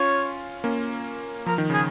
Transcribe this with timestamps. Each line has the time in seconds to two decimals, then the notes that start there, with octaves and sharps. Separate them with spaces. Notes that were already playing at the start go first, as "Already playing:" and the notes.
Already playing: C#4 F4 C#5
0.64 A#3 C#4
1.46 F3 A#4
1.58 D#3
1.70 C#3 G#4